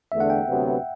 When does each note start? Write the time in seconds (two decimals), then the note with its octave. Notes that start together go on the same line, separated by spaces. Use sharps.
0.12 E2 D3 A3 E5
0.20 F#5
0.30 G5
0.48 D2 C3 F#3 B3